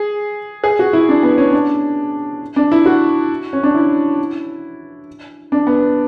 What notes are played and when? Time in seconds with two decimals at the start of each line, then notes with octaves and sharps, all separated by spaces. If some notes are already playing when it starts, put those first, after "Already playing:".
Already playing: G#4
0.64 G#4
0.79 F#4
0.93 E4
1.09 D4
1.23 B3
1.38 C#4
1.52 D4
2.56 D4
2.72 E4
2.86 F#4
3.53 C#4
3.63 D4
3.74 E4
5.52 D4
5.67 B3